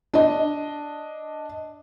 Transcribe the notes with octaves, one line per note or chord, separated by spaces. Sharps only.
D4 D#5